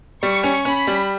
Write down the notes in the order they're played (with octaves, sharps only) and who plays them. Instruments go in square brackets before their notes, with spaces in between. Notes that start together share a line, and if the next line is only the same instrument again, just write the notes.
[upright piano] G3 [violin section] C#6
[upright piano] C#4
[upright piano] C#4 [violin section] B5
[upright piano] G3